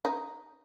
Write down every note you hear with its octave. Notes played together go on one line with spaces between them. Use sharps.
D#4